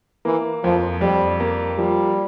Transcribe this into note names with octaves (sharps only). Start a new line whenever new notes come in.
E3 A#3
F2 F3
F2 G3
A#3
F3 G3